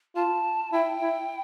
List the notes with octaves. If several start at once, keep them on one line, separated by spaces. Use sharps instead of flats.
F4 A5
E4 G5
E4